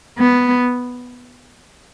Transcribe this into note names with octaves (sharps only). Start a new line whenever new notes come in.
B3